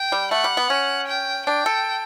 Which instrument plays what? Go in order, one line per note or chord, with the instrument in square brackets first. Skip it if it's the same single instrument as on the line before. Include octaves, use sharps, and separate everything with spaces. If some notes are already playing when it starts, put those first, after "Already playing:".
Already playing: [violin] G5
[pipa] G3
[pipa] A3 [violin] F#5
[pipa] G3
B3
C#4
[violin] G5
[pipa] D4 [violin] G5
[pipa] A4